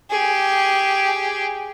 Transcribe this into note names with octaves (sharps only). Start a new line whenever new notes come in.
G4 G#4